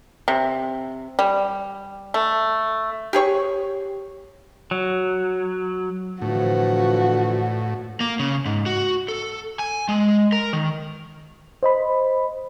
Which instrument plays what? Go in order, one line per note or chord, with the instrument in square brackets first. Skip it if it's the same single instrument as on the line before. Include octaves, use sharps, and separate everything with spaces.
[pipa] C3
G3
A3
G4 G#4 C#5 C#6
[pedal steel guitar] F#3
[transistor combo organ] A2 [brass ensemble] D3 E3 F3 [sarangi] F#4
[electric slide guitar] A#3
C#3
G#2
F#4
A4
G#5
G#3
A#4
D#3
[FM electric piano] C5 D#5 B5